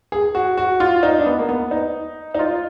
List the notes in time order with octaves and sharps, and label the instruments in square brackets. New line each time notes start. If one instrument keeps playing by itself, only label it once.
[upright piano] G#4
F#4
F#4
F4
D#4
D4
B3
A#3
B3
D#4
D#4
F4